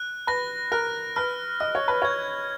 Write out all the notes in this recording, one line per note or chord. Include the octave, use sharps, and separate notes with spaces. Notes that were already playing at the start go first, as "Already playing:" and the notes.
Already playing: F#6
B4 A#6
A#4 F#6
B4 F6
D#5 F6
C#5
B4
C#5 G#6